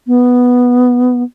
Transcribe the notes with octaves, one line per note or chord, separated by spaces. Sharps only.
B3